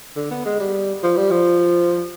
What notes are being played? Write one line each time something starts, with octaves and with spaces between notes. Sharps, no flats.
D3
B3
G#3
G3
F3
G3
F3